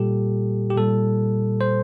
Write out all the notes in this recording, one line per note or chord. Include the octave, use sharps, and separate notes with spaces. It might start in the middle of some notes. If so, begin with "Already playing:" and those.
Already playing: A#2 G3 G4 A4
G4
A#2 G3 A4
C5